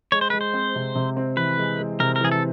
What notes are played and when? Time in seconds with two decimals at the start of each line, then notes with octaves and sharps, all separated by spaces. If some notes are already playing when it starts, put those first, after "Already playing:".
0.12 G#3 C#5
0.21 C5
0.30 G#3 B4
0.41 C5
0.54 C4
0.75 C3
0.95 C3
1.17 C4
1.37 E3 B4
1.58 G#3
1.79 G#3
2.00 C3 A#4
2.16 A#4
2.21 E3 G#4
2.32 A4